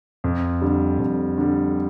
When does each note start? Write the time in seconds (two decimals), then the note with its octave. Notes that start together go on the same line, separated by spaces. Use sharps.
0.24 F2
0.62 D3 G3
0.99 F2
1.38 D3 G3